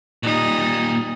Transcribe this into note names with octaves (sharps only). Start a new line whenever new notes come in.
A#2 G3 D#4